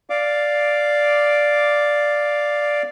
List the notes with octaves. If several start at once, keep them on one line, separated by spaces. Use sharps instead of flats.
D5 F5 D6